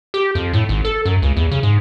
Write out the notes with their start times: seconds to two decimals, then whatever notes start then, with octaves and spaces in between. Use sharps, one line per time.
0.14 G4
0.35 F2
0.53 A2
0.69 G#1
0.85 A4
1.05 F#2
1.22 C#2
1.37 E2
1.51 C#3
1.63 G#2